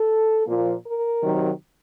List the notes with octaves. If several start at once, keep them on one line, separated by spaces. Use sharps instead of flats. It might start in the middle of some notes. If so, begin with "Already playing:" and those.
Already playing: A4
A#2 F3 A#3
A#4
C3 D#3 F#3